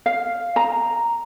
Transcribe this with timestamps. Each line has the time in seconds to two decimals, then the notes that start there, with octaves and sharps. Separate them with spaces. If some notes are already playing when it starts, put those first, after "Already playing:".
0.06 F5
0.56 A#5